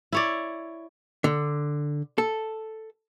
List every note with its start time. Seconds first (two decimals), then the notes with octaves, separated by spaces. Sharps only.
0.12 E4 C#5 D5
1.24 D3
2.18 A4